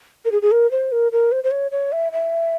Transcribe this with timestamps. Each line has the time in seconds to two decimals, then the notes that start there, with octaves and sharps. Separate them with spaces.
0.25 A#4
0.32 G#4
0.42 G#4
0.51 A#4
0.71 C5
0.92 A#4
1.12 A#4
1.32 C5
1.44 C5
1.51 C#5
1.71 C#5
1.92 E5
2.12 E5